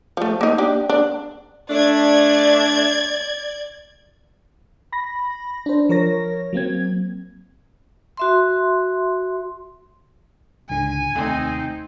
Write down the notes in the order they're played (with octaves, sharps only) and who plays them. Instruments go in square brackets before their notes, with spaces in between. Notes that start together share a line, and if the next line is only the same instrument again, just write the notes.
[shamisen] F3 A3
A#3 D#4
D4 G4
D4
[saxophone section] A3 D4 [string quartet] D5 G#6
[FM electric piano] B5 A#6
D4 C5
F3 A#4 C#5 A#6
F#3 A#3 C4 G#6
[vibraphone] F#4 E5 C6
[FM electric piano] C#2 G#2 D3 [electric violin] G#5
[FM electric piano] D#2 C3 A3 [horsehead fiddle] C4 D#4